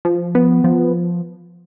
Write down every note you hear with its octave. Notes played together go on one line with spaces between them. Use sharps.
F3
B3
F3